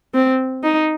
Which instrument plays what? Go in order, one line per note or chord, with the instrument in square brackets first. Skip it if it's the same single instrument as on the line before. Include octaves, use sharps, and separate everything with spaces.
[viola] C4
D#4